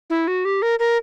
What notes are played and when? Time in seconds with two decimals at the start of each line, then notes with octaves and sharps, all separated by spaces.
0.10 E4
0.28 F#4
0.45 G4
0.62 A#4
0.79 A#4